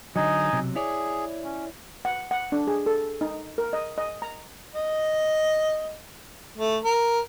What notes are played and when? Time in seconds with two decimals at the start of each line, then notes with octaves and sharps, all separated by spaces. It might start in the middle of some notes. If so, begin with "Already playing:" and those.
0.16 D3 F#3 D#4 D#5 G#5
0.53 B1 C3 F#3
0.76 E4 G#4 C#5 D5
1.44 C#4
2.05 F#5
2.31 F#5
2.52 D4
2.67 G#4
2.86 A4
3.21 D#4
3.58 A#4
3.73 D#5
3.98 D#5
4.22 A#5
4.75 D#5
6.57 A3
6.84 A#4